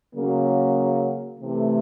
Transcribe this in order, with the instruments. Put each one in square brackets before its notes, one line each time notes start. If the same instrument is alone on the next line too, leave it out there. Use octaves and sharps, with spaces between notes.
[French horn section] C#3 F#3 A#3
C3 E3 A3